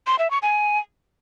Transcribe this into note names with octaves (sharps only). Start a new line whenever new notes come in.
C6
E5
C#6
G#5